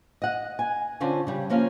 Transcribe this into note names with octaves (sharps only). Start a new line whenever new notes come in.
D#5 F#5
G#5
D3 C4 C#4 F4
C#3 G3
F3 A#3 C#4 F5